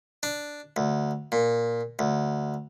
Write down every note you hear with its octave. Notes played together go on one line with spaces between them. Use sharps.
D4
D2
A#2
D2